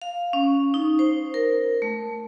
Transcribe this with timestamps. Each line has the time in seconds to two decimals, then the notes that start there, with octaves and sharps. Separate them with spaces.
0.02 F5
0.33 C#4
0.74 D#4
0.99 C5
1.34 A#4
1.82 A3